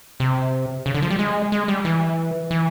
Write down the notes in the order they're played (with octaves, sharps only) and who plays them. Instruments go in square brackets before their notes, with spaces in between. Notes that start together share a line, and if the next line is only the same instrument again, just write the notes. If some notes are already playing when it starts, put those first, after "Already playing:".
[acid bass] C3
C#3
D3
F3
G3
G#3
G#3
G3
E3
E3